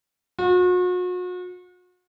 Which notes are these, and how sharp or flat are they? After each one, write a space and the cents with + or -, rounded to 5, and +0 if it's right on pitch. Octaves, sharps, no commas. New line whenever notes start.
F#4 -40